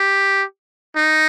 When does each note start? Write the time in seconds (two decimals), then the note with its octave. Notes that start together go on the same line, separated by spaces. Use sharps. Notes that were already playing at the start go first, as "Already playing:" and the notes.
Already playing: G4
0.96 D#4